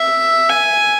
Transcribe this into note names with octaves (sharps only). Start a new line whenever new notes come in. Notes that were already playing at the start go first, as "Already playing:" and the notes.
Already playing: E5
G#5